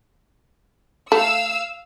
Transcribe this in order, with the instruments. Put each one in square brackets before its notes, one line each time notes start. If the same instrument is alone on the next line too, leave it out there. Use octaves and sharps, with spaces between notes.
[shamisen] A3 [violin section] F5 E6